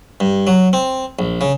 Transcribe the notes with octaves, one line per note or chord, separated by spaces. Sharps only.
G2
F#3
C4
A#1
C#3